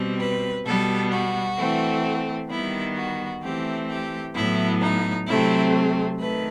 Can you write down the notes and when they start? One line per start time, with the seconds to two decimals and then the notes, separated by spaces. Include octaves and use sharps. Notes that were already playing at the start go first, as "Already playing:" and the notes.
Already playing: B2 G3 C4
0.20 B4
0.65 B2 G3 B3 A4
1.12 F#4
1.57 E3 A3 C4
2.50 D#3 G3 B3 E4
2.96 F#4
3.42 E3 A3 C4 G4
3.89 G4
4.34 A2 F#3 B3 E4
4.81 D#4
5.27 C3 F#3 A3 C4 E4
6.19 D#3 A3 B4